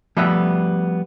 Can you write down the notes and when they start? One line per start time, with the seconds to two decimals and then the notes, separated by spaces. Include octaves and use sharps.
0.17 F3 G3 A3 B3 F#4 E5